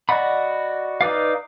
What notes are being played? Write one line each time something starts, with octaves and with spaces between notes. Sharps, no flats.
F#4 D5 D#5 F#5 B5
D#4 B4 D5 F5